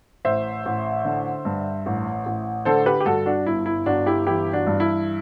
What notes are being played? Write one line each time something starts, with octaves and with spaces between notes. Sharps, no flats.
A1 C5 E5
A1
D3
G2
A1
A1
D3 A4 C5
G4 B4
G4
G2 F#4 A4
D4 F#4
G1 E4
E4
G1 D4 F#4
E4 G4
E3 E4 G4
D4 F#4
G2
E4